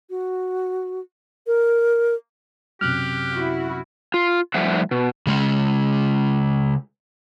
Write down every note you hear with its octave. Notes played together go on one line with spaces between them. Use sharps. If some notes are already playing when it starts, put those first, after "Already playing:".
F#4
A#4
F#2 C3 G4 F6 F#6
E4 F#4
F4
A2 F3 G3 E5 F#5
B2
C#3 G#3 C#4